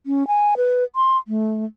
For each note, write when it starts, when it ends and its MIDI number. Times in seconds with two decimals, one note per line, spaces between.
0.06 0.27 61
0.27 0.54 80
0.57 0.84 71
0.96 1.17 84
1.28 1.65 57